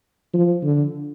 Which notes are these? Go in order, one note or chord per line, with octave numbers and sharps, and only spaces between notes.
F3
D3